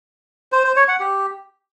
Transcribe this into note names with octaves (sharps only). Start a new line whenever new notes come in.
C5
C5
C#5
F#5
G4